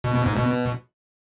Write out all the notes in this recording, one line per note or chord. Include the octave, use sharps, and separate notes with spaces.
B2
B2
G#2
B2